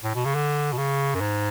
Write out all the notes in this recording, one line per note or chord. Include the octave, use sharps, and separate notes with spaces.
A2
B2
C#3
D3
B2
C#3
F#2
G#2